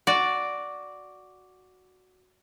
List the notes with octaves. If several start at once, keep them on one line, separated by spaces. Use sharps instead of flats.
F#4 D5